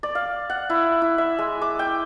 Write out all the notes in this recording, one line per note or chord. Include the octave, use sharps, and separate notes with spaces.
D5
F5
F#5
E4
E4
E5
G#3
D6
G5